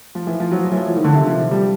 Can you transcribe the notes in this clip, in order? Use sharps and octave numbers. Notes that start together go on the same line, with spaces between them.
F3
E3
F3
F#3
F3
E3
F3
E3
D#3
D3
C3
F3
G3